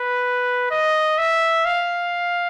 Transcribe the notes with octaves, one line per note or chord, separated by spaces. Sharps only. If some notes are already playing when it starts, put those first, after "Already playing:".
Already playing: B4
D#5
E5
F5